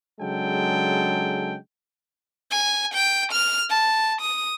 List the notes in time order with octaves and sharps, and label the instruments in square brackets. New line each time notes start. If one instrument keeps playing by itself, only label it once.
[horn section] C#3 F#3 G#3 D4 A4 G5
[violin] G#5
G5
F6
A5
D#6